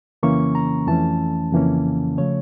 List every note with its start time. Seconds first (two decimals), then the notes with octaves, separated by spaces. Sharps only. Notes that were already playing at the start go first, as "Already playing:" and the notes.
0.23 F2 C#3 E3 A#3 C#4 C#6
0.55 A#5
0.87 F2 E3 A3 C#4 A5
1.53 F2 C#3 E3 A#3 C#4
2.17 C#3 F3 A3 C#5